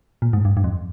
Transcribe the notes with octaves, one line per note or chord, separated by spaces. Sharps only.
A#2
G#2
G2
G2
F2